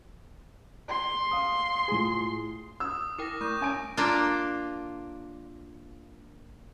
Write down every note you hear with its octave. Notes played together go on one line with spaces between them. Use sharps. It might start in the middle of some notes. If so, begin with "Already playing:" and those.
C6
F5 D#6
A2 F4 G#4
D#6 E6
E4 A#4 G5 D6 A#6
A3 C#6 G6
C#4 G#5 D7
A#3 D4 F4